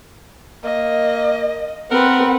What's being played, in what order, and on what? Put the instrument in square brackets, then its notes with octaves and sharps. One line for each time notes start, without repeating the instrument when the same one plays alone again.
[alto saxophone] A#3 [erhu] D#5
[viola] C4 B4 [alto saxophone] A#4 [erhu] F#5